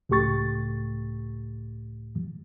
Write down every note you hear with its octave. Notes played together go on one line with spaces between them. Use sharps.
C#2 A2 A3 G4 C#6 A6